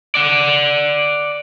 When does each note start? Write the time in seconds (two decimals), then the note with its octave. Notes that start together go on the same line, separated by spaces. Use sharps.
0.15 D5 F#5